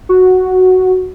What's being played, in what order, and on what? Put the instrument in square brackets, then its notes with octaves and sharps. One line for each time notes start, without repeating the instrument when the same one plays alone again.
[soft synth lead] F#4